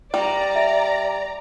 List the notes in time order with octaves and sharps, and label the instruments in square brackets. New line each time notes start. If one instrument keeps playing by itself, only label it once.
[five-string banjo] G3 [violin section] D5 A#5
[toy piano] E5